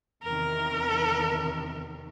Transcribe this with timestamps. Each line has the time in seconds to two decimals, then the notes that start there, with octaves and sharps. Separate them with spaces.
0.23 E2 C3 D#3 A#4